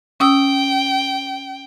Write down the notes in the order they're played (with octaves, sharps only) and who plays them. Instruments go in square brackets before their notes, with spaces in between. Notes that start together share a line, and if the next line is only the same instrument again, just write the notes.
[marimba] C#4 D#6 E6 [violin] G5